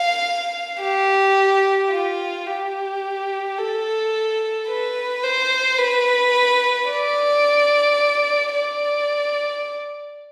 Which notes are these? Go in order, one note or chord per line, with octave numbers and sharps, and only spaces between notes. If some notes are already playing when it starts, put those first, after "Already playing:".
Already playing: F5
G4
F4
G4
A4
B4
C5
B4
D5
D5